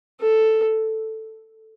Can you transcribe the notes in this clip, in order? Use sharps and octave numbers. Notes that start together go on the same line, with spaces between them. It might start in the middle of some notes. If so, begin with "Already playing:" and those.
A4